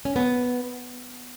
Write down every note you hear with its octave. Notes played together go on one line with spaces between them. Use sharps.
C#4
B3